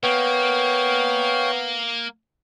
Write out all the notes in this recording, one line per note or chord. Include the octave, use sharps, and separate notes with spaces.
A#3 B3 C#5 F5 G5